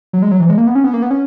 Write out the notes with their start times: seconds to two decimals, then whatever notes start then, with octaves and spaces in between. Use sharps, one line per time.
0.13 F#3
0.22 G#3
0.31 F#3
0.40 E3
0.49 G#3
0.58 A#3
0.67 B3
0.75 C#4
0.84 B3
0.94 A#3
1.02 B3
1.11 C#4